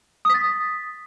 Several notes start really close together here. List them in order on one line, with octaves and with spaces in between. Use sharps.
D#6 B6 A6